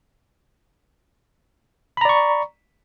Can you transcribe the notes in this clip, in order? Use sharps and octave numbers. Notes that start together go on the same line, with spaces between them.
D5 A#5 B5 C#6